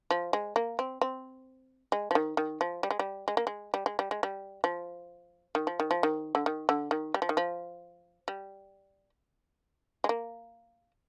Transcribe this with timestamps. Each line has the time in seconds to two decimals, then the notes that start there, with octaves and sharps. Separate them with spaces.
0.11 F3
0.33 G#3
0.56 A#3
0.79 C4
1.02 C4
1.92 G#3
2.11 F3
2.15 D#3
2.37 D#3
2.61 F3
2.83 G3
2.91 G#3
2.99 G3
3.28 G#3
3.37 A#3
3.47 G#3
3.74 G3
3.86 G#3
3.99 G3
4.11 G#3
4.23 G3
4.64 F3
5.55 D#3
5.67 F3
5.80 D#3
5.91 F3
6.03 D#3
6.35 D3
6.46 D#3
6.69 D3
6.91 D#3
7.14 G3
7.22 F3
7.29 D#3
7.37 F3
8.28 G3
10.04 G#3
10.09 A#3